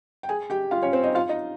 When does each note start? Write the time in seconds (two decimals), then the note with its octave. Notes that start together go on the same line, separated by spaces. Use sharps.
0.23 G5
0.29 G#4 G#5
0.50 G4 G5
0.71 F4 F5
0.83 C#4 C#5
0.93 C4 C5
1.03 D#4 D#5
1.15 F4 F5
1.29 D#4 D#5